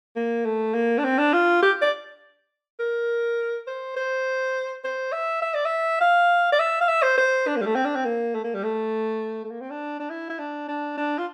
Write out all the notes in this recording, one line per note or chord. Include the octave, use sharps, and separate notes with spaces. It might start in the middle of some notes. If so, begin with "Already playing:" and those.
A#3
A3
A#3
D4
C4
D4
F4
G4
D5
A#4
C5
C5
C5
E5
E5
D5
E5
F5
D5
E5
F5
E5
C5
C5
D4
A#3
G3
A3
C4
D4
C4
A#3
A3
A#3
G3
A3
A3
A#3
C4
D4
D4
E4
E4
D4
D4
D4
F4